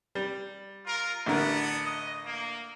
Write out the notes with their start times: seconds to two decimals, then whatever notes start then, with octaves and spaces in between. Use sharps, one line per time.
0.15 G3
0.86 F4 A#4
1.26 A1 D3 B3 D4 A#4
1.85 D#5
2.26 A#3